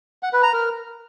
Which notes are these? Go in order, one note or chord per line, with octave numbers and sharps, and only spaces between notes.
F#5
B4
A#5
A#4